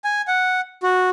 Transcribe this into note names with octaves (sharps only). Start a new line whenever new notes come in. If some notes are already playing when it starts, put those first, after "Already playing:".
G#5
F#5
F#4